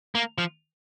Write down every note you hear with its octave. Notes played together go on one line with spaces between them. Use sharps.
A#3
F3